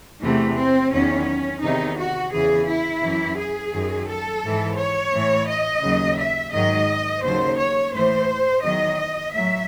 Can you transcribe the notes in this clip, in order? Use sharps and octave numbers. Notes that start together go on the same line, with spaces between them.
E2 C3 E3 A3
C4
E2 D#3 F#3 C#4
E2 C3 D#3 D#4
F#4
E2 C#3 E3 G#4
E4
F#2 E3
G#4
F#2 D#3 F#3
A4
G#2 E3
C#5
A2 E3
D#5
D#2 C#3 F#3
E5
G#2 D#3 F#3 D#5
D#2 C#3 F#3 C5
C#5
A2 E3 C5
E2 D#3 F#3 D#5
A2 F#3 E5